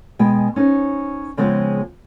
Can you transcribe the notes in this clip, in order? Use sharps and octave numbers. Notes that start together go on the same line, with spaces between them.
B2 G#3 G5 G#5
C#4 D#4 C5
C#3 F3 G#3 B3 C4 G#4